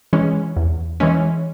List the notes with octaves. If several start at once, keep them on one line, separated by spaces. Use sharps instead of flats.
E3 G#3 C#4
E2
E3 G#3 C#4